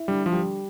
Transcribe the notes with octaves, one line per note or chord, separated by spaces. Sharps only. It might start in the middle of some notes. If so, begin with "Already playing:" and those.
Already playing: E4
D3 G3
F3
G3